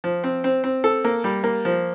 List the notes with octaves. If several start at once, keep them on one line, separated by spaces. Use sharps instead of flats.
F3
C4
C4
C4
A4
A#3
G3
A#3
F3